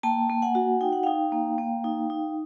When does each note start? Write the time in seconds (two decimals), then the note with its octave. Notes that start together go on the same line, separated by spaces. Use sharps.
0.03 A#3 G5 A5
0.30 A#3
0.42 F#5 G#5
0.55 F#4
0.81 D#4 G5
0.92 F#5
1.03 D#4 F5 G5
1.32 A#3
1.58 A#3
1.84 D#4
2.10 D#4